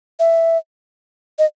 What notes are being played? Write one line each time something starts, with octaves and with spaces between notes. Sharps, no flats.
E5
D#5